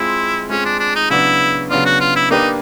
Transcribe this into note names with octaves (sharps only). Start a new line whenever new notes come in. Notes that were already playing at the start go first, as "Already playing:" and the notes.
Already playing: G#3 C4 E4 F4 G#4
G#3 C4 C#4 F4 G#4
D4
D4
D#4
C#3 F#3 B3 D4 E4
C#3 F#3 B3 D4 F4
F#4
F4
E4
A#3 D4 D#4 G4 B4